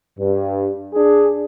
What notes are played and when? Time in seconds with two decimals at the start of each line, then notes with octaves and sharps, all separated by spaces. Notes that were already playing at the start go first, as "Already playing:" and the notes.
0.19 G2
0.94 D4 G#4